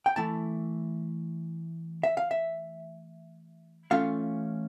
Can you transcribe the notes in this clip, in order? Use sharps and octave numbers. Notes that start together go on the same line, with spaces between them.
G5
E3 A3 E4 A5
E5
F5
E5
E3 A3 C#4 F4 F5